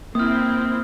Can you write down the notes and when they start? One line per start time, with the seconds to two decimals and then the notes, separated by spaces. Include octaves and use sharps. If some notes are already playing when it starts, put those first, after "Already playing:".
0.15 A#3 C4 E4 D#6 F6